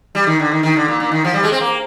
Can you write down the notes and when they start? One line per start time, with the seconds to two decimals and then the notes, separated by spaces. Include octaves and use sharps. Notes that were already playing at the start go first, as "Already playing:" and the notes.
0.15 G3
0.27 D#3
0.39 D3
0.52 D#3
0.63 D#3
0.76 D3
0.88 A#2
1.00 A#2
1.12 D#3
1.24 F3
1.33 G3
1.43 G#3
1.52 C4
1.61 A#3